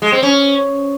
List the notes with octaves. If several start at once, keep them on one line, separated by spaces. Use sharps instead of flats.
G#3
C4
C#4